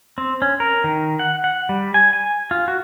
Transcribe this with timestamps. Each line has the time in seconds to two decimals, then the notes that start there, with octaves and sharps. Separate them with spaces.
0.18 C4
0.42 C#4
0.60 A#4
0.84 D#3
1.19 F#5
1.44 F#5
1.69 G3
1.94 G#5
2.13 G#5
2.51 F4
2.68 F#4